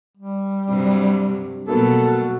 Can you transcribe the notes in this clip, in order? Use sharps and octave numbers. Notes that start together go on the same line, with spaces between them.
G3
G2 C3 F#3
B2 F#3 A#3 B3 F#4 A4